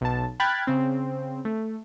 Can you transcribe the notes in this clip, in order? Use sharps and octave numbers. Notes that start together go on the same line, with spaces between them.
B1 A5
G5 B5 F6 F#6 G#6 A6
C#3 C4
A3